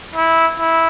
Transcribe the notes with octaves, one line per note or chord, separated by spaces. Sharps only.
E4
E4